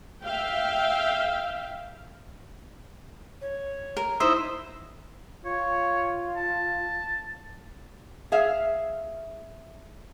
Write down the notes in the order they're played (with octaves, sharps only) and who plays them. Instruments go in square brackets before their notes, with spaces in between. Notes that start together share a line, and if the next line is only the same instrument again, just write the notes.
[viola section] E5 F5 G5
[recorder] C#5
[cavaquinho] A#4
[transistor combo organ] D#4 E4 E5 [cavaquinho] C5
[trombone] F4 [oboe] C#5
[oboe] A5
[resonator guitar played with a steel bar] G#4 E5 F5